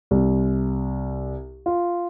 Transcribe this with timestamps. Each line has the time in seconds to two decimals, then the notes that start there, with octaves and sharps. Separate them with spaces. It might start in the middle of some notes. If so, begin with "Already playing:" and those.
0.11 C2
1.66 F4